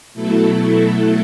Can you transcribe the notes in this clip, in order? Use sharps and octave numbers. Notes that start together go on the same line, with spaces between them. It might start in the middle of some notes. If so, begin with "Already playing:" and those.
B2 F#3 A3 E4 A4